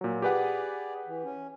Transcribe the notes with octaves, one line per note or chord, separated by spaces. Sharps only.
A#2 F#3
G4 G#4 B4 D5 F#5
E3
C#4